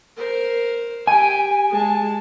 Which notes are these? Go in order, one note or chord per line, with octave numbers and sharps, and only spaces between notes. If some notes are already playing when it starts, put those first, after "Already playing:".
A#4 C5
G4 G5 G#5
G#3 A5